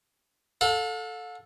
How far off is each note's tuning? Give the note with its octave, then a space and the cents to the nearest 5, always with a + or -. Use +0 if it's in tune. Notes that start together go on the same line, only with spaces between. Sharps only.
A4 +0 F5 +45